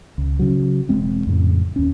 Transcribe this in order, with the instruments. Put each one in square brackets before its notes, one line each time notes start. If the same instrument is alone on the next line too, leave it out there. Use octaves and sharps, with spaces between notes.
[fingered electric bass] C#2
C#3 F#3
E1 E2 G#3 C4
F2 A2 C#3
D#2 C#4